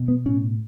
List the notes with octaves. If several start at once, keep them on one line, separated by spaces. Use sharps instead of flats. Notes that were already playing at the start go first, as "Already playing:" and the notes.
Already playing: B2
B3
A2 C#4